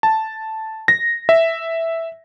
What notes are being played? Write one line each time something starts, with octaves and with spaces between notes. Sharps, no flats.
A5
A#6
E5